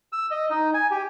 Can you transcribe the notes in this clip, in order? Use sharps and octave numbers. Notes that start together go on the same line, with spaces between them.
E6
D#5
D#4
G#5
G4